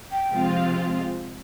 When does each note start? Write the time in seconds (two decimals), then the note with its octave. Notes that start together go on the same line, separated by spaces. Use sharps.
0.12 G5
0.32 C3 F3 G#3 C4 F4